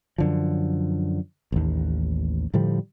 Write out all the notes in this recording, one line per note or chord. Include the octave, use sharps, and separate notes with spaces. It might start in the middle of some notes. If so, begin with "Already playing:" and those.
F#2 D3 F3
A1 D#2
A2 D3 F3 G3